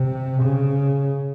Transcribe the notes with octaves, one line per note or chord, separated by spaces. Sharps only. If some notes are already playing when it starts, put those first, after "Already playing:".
Already playing: C3
C#3